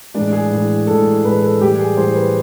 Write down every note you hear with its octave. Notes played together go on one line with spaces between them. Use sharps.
A2 E3 G#3 D4
G#4
A2 E3 G#3
A2 E3 G#3 A4
A2 E3 G#3 B4
A4
A2 E3 G3 G4
G#4
A2 E3 G3 C5
B4